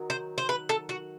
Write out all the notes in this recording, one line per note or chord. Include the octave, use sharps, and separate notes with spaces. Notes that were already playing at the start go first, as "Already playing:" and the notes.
Already playing: D#3 F#3
C5
C5
B4
A4
F#4